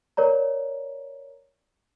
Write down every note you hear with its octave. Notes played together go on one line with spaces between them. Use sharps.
A#4 C#5 D5 A#5